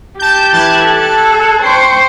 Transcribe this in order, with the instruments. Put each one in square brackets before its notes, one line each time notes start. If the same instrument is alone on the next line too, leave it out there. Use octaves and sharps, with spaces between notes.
[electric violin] G4 [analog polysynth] A5 G6
[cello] E3 [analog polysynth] A5 F#6 G#6
[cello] A4
[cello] C5 [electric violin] G5 C#6